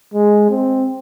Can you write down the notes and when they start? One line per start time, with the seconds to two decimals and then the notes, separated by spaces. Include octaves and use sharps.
0.14 G#3
0.50 C4